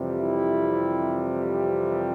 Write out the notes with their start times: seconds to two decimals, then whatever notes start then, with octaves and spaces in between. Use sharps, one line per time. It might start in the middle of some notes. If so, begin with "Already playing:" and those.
Already playing: F2 C3 E3 G3
0.20 E4